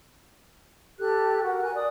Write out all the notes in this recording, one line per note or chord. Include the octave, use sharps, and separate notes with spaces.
G4 A4 F#6
F#4 A#4 F#5
A#4 G#5 F#6
D5 D#6